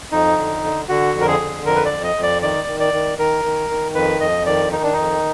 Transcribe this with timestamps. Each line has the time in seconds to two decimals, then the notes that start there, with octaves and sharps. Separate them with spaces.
0.12 F2 D#4
0.38 D3
0.64 D3
0.89 D3 F#4
1.15 F2
1.21 A#4
1.28 G#4
1.40 D3
1.66 F2 A#4
1.76 B4
1.85 D5
1.92 F2
2.04 D#5
2.16 F2
2.23 D5
2.42 D#3 D5
2.68 D#3
2.80 D5
2.93 D#3
3.18 D#3 A#4
3.44 D#3
3.70 D#3
3.95 F2 B4
4.20 F2 D#5
4.46 D#3 D5
4.72 D#3 D#4
4.83 D4
4.93 F2 D#4